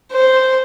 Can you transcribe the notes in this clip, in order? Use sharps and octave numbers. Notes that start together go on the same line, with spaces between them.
C5